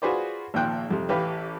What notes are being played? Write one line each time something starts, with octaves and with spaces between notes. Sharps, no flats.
F4 F#4 G#4 B4 C5 D5
G#1 A#2 F3 G5 F#6
F2 C3
A1 G4 B4 F5